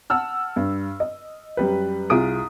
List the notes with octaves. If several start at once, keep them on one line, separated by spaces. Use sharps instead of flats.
F#5 A5 E6 F6
G2
D#5
F#2 G3 B4
C2 F4 G#4 D#6 D7